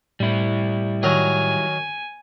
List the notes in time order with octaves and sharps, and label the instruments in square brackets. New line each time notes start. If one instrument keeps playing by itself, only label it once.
[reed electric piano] A2 [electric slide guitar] G3 E4
[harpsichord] D#3 F#3 A#4 [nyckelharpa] G#5